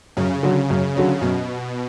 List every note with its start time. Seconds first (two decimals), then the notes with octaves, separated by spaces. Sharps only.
0.17 F#2 C#3
0.43 D3 F#3 C#4
0.70 F#2
0.96 D3 F#3 C#4
1.21 F#2 B2